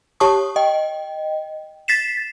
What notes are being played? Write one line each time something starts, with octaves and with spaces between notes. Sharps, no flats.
G4 C#5 A5 C#6 D#6
D#5 G5
A6 B6 C7 E7